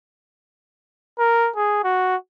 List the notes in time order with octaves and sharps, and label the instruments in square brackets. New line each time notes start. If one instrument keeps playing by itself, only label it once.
[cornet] A#4
G#4
F#4